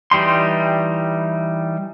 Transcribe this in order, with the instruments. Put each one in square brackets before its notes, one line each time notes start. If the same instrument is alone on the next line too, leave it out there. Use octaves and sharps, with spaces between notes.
[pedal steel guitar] E3 G3 D#4 C6